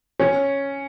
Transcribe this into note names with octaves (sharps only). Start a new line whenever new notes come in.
C#4